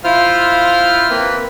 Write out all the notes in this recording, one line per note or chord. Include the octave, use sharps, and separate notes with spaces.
E4 F4 C5 F5 F6
A#3 C4 B4